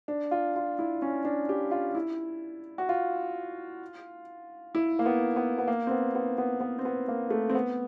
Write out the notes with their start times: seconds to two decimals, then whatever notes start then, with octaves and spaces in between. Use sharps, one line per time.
0.08 D4
0.31 F4
0.56 F4
0.79 E4
1.02 C#4
1.25 D4
1.49 G4
1.71 F4
1.95 E4
2.78 F#4
2.89 F4
4.75 E4
4.99 A#3
5.06 B3
5.36 B3
5.58 B3
5.67 A#3
5.87 C4
5.91 B3
6.15 B3
6.38 B3
6.61 B3
6.79 C4
6.85 B3
7.08 A#3
7.31 A3
7.50 C4
7.55 B3